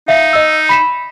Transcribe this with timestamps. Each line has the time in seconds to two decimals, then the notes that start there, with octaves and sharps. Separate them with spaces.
0.08 D#4 E5 F5
0.33 D#5 E6
0.69 B5 B6 E7